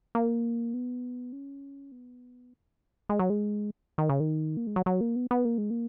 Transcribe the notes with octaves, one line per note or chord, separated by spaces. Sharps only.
A#3
B3
C#4
B3
G#3
F#3
G#3
D#3
C#3
D#3
A#3
G#3
F#3
F#3
A#3
B3
B3
A#3
G#3
A#3